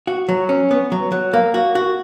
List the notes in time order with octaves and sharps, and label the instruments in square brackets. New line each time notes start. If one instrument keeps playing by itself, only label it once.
[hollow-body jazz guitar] F#4
F#3
C#4
B3
F#3
F#3
A#3
F#4
F#4